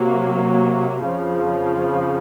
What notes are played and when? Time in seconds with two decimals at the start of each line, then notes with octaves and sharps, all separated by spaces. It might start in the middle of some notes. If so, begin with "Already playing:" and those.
Already playing: C3 F#3 A#3
1.06 F2 C#3 F3